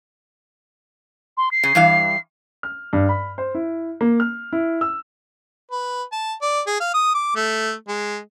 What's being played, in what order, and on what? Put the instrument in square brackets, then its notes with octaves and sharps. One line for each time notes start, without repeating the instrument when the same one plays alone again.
[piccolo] C6
C7
[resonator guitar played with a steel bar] C#3
G2 E3 F5
[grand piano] F6
G2
B5
C5
E4
A#3
F6
E4
E6
[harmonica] B4
A5
D5
G#4
F5
D#6
D6
A3
G#3